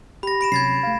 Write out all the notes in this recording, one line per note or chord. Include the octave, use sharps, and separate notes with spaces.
G4 B5 A#6
B5 D7 E7
C3 F#3 C#4 G#6 A6 C7
A3 F5